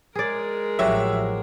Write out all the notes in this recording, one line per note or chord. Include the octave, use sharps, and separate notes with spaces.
G#3 G#4 A#4 D5
A1 F3 F#3 F#4 G4 E5